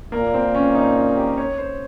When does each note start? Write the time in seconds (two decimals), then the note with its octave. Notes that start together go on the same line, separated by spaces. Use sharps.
0.12 A#2 A#3
0.34 C4
0.55 C#4
0.75 D#4
0.96 D#4
1.17 G4
1.38 C#5
1.58 C5